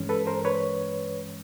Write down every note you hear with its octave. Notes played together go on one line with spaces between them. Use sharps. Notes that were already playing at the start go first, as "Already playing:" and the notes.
Already playing: G2 E3 G#3 C#4
A4 B4
A#4 C5
B4 C#5